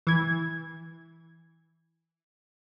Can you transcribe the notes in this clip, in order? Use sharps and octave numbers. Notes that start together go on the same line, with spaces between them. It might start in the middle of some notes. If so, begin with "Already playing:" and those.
E3 G#6